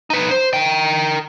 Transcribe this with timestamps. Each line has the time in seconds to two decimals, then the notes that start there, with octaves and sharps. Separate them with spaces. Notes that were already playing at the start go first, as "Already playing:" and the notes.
0.10 D#4 B4
0.31 C5
0.53 A#4 G5